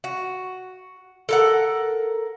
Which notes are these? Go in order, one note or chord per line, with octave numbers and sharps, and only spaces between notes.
F#4
A4 A#4 F#5